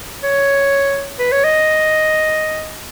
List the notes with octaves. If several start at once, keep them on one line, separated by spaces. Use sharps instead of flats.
C#5
B4
C#5
D#5